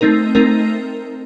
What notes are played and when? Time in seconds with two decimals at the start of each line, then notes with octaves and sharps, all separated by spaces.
0.01 A3 C4 D#4 A#4
0.35 A3 C4 D#4 A#4